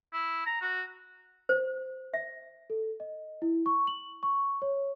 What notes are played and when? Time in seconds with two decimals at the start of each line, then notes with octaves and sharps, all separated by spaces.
0.13 E4
0.46 A#5
0.62 F#4
1.49 C5
2.14 E5
2.70 A4
3.00 D#5
3.42 E4
3.66 C#6
3.87 F#7
4.23 C#6
4.62 C#5